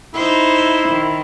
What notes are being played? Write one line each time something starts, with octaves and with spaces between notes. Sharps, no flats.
D#4 E4 C5
D#3